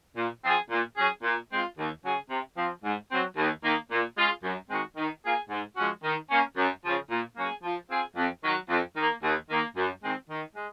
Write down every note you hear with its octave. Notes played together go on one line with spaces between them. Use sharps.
A#2
F3 C4 F4 G#4
A#2
F#3 C#4 G#4
A#2
G#3 C4 F4
D#2
C#3 F#3 C#4 G#4
C3
F3 C4
G#2
F#3 C4
D#2
D#3 A#3
A#2
G#3 C#4 F4 G#4
F#2
D#3 G#3 C4 F#4
D#3
A#3 F4 G#4
G#2
F3 G#3 C#4 F#4
D#3
A#3 C#4
F#2
C#3 F3
A#2
F#3 A#3 C#4 G#4
F3
C4 F4 G#4
F2
D#3 F#3
F2
D#3 A#3
D#2
D#3 A#3
F#2
D#3 G#3 C4
D#3
G#3